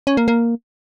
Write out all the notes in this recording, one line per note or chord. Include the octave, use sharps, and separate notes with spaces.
C#4
A#3
A#3